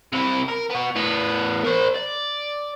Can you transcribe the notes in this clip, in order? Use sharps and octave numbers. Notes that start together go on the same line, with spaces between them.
C3 E4
A#4
B3 F#4
A2 B3
A#4 C5
D5